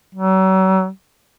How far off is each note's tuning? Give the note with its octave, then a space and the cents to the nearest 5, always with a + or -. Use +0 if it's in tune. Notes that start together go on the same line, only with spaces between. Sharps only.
F#3 +40